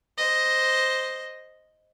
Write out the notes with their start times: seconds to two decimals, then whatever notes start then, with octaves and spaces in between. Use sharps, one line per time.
0.18 C5 D#5